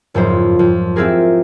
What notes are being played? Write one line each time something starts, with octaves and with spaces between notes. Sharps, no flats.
F#1 F2 G#2 C5
F2
C4 E4 F4 G4 G#4 A#4